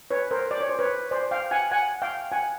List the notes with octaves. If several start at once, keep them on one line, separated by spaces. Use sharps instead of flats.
B4 C#5
A#4 C5
D5
C#5
C5
B4 C#5
C5 D5
F5 G5
F#5 G#5
F#5 G#5
F5 G5
F#5 G#5